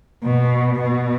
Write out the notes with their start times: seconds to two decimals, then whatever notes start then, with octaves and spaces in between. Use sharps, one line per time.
0.24 B2
0.79 B2